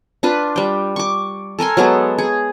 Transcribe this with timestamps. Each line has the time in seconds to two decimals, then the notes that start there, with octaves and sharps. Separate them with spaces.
0.23 D4 F4 B4
0.56 G3 G5
0.96 C#6 D6
1.59 A4 A#4 G#5 C6
1.77 F#3 G#3 B3 A4
2.18 G#4